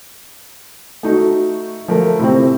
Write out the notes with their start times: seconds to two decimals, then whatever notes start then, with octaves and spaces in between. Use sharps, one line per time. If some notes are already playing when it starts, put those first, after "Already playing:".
1.03 A3 D#4 F#4
1.88 F3 A3 A#4
2.19 A2 C3 C4